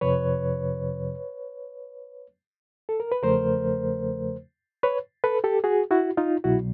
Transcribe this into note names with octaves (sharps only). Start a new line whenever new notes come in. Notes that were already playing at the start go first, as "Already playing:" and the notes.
F2 C3 F3 B4 C#5
A4
A#4
B4
E2 C#3 F3 A3 A#4 C5
B4 C#5
A4 B4
G4 A4
F#4 G#4
E4 F#4
D#4 F4
C2 B2 F#3 E4 F#4